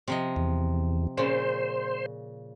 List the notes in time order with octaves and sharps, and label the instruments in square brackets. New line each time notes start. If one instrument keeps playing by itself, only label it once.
[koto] C3 F3 D#5
[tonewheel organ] E2
[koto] A#2 C#3 [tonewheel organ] C5